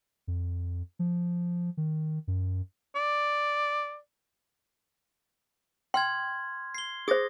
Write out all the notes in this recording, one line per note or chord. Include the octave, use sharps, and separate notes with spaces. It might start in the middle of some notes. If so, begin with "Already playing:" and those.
F2
F3
D#3
F#2
D5
G5 C6 F6 G#6
C7 G7
G#4 C5 D#6 A6 A#6